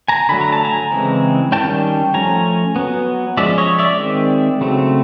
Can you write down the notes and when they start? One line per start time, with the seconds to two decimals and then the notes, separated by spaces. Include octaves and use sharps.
0.08 G#5 A#5
0.29 D3 F#3 A3 B5
0.41 A#5
0.52 A5
0.64 G#5 A#5
0.91 C#3 E3 G#3 C4
1.52 D#3 G3 A#3 C#4 G5 A5
2.14 F3 A3 C#4 G#5 A#5
2.76 F#3 B3
3.37 F3 G#3 C#4 D5 E5
3.58 C#5 D#5
3.79 D5 E5
3.99 D#3 G#3 C4
4.61 C#3 F#3 A3 C4